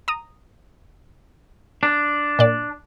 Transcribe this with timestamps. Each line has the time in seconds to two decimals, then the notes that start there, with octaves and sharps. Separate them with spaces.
0.08 A#5 D#6
1.83 D4
2.39 A#2 D5